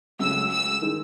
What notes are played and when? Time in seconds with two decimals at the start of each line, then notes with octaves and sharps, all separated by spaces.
0.19 C#2 C#3 F#3 A3 E6
0.50 E6
0.82 D#3 G#3 D#4